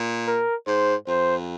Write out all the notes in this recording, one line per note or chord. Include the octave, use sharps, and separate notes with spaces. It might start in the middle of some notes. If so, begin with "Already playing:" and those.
Already playing: A#2
A#4
G#2 C5
F2 C5